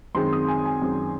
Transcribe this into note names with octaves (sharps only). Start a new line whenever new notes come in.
F#2 D#3 G#3 C4 C6
D#6
G#5
G#5
F#2 D#3 G#3 C4